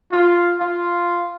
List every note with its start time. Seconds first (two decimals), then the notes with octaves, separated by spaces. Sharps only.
0.11 F4
0.59 F4